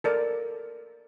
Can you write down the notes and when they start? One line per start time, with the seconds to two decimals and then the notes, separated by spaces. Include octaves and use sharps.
0.04 A4 A#4 D5